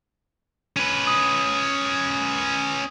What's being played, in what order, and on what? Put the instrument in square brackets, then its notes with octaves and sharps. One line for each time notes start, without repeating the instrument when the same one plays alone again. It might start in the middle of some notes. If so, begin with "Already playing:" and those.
[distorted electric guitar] C#4 B4 [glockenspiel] D#7
[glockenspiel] D#6